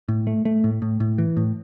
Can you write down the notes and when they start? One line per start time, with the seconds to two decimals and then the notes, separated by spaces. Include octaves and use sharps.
0.08 A2
0.27 A3
0.45 A3
0.64 A2
0.82 A2
1.00 A2
1.18 E3
1.37 A2